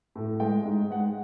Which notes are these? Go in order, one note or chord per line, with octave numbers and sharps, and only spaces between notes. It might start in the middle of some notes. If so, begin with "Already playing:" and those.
A2
G#3 G5
G#2
G#3 F#5